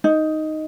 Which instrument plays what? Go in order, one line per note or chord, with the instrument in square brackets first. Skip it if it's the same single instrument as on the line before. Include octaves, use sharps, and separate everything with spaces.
[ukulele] D#4